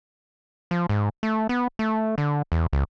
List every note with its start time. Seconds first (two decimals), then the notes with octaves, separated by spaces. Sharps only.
0.71 F3
0.89 G#2
1.23 A3
1.49 B3
1.79 A3
2.18 D3
2.52 E2
2.73 C#2